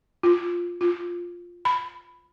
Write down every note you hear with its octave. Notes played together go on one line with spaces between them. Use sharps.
F4
F4
B5